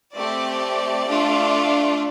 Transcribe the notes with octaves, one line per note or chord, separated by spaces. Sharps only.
A3 C4 G4 D5
A3 D4 F4